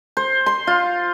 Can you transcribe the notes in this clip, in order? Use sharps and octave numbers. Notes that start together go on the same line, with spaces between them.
C5
C6
F4